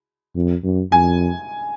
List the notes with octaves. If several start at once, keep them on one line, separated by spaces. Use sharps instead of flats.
F2
F#2
F2 G#5